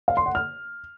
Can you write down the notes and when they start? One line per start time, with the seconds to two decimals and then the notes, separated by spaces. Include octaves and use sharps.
0.08 F5
0.17 C6
0.26 F#5
0.35 F6